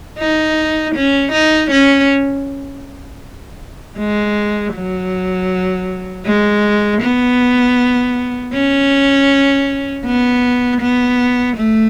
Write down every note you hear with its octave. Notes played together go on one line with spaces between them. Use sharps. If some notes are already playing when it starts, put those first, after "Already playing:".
D#4
C#4
D#4
C#4
G#3
F#3
G#3
B3
C#4
B3
B3
A3